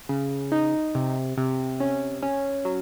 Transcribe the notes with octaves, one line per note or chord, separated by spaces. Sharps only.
C#3
D#4
C3
C3
C#4
C#4
F#3